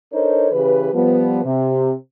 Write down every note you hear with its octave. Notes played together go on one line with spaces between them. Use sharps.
D4 D#4 A4 A#4 C5 C#5
C#3 E3 G4 B4
F3 G3 B3
C3